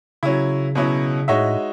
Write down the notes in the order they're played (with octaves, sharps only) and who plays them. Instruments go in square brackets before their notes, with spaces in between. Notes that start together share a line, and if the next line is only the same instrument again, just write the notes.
[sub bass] C#3 [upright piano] F#3 C#4 E4
[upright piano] B2 F#3 C#4 E4
[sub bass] A2 [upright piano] G#3 D#4 F#4 C#5 E5